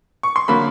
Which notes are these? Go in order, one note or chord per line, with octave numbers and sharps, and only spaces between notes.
C#6
C6
D3 F#3 A#3 B5